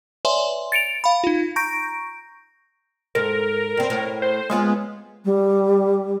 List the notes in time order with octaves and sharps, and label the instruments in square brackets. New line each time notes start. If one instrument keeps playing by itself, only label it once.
[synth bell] B4 C#5 D5 E5 G#5 C6
A6 C#7 D7 F7
F5 B5
D#4 F4
A#5 C#6 G6 A#6 D7
[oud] G#2 A4 [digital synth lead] A#4
[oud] G2 C4
A2
[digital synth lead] C5
[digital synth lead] G#3 [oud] B3 F4 C#5
[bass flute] G3